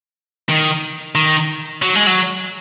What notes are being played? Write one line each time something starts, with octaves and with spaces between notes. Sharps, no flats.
D#3
D#3
F#3
G#3
F#3